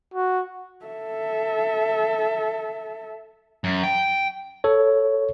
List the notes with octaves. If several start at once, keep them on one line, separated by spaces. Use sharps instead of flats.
F#4
A4 E5
F#2
G5
A4 C#5